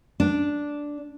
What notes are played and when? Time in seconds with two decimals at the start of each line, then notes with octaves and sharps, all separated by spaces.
0.20 D4